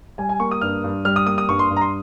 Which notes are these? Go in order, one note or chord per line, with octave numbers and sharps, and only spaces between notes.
G3 G#5
G#5
A#3 C#6
D#6
G2 F6
G2
G3 F6
D#6
A#3 D#6
D#6
G2 C#6
C6
G2
A#5
C6